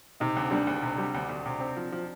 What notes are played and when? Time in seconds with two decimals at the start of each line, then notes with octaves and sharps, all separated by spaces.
0.20 C3 D#4
0.37 D2
0.51 G3 D4
0.67 D2
0.82 C3
0.98 G3
1.14 D2
1.29 D2
1.46 C3
1.60 C4
1.77 F3
1.92 F3